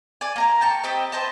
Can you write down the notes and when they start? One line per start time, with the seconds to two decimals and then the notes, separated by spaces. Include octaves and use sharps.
0.21 D5 G#5
0.36 A#3 A#4 A#5
0.61 G5 A5 C#6
0.84 C4 G4 D#5 B5
1.12 B4 C5 D#5 A5